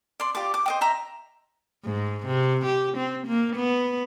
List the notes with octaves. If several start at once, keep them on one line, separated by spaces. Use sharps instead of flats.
D5 C6
F4 G4 D5 D6
D6
C5 D#5 G5
D#5 E5 A#5
G#2
C3
G4
C4
A#3
B3